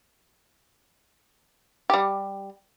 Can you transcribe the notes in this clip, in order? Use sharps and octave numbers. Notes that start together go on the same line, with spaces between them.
G3 G4